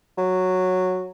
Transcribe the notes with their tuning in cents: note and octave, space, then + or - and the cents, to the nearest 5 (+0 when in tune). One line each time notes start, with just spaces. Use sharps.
F#3 -5